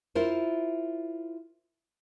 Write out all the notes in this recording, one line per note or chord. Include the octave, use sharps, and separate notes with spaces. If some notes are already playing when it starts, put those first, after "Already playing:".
E4 F4 A#4 C5